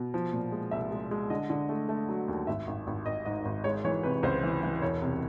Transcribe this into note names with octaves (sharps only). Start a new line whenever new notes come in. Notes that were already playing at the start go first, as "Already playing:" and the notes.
Already playing: B2
F3
A#2
G#3
C2 E5
G#3
G#3
D3 D#5
D3
A3
A3
F#3
D#2
G#1 E5
G#1
G#1
G#1 D#5
G#2 D#5
G#1
G#3 C#5
E3 C#5
C3 B4
C#2 C5
E3
E3
E1 C#5
C3